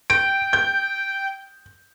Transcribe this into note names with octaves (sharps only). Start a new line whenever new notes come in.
G5 D7
G6